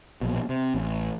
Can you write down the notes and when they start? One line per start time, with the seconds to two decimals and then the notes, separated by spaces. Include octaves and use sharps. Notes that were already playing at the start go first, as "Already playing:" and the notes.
0.21 A#1 B2
0.49 C3
0.75 A1